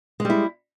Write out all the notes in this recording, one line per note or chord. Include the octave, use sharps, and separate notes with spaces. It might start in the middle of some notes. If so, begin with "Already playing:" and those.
G3 G#3 E4